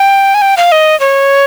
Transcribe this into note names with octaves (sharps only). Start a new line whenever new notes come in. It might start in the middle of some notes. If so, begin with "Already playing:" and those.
Already playing: G5
G#5
G5
F5
D#5
C#5